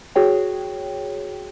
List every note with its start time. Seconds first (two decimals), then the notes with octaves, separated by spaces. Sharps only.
0.15 F#4 G#4 C#5 G5